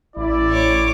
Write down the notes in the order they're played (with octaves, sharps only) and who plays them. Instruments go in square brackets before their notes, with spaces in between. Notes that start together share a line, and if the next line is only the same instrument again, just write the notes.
[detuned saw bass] A1 [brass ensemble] E4 D5
[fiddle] C#5 D6